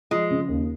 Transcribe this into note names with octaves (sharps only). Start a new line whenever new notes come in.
F3 G#3
C#3
D#2